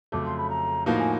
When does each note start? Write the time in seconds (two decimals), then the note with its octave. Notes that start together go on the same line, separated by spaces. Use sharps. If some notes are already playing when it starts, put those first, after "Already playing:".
0.12 F2 C#3 F#3 A3 D6
0.25 C6
0.37 B5
0.49 A#5
0.86 A2 F3 A#3 D#4 F#4 A5
0.98 G#5